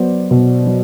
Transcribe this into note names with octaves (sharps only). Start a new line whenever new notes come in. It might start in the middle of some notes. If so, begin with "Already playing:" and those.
Already playing: F#3 B3 C5 D5
B2
F#3